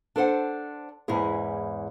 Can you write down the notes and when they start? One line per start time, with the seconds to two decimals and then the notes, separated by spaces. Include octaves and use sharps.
0.16 D4 A4 C5 F#5
1.08 E2 G#2 C#4 E4 G#4